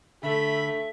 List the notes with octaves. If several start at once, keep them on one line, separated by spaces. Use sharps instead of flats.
D3 A3 E5 B5